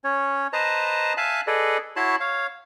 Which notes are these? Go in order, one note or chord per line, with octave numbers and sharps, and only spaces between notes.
C#4 C#5
B4 C5 D#5 A5 A#5
E5 F5 G#5 A5 F#6
G#4 A4 B4 D5 D#5
E4 F#4 C#5 A5 B5 C6
C#5 F5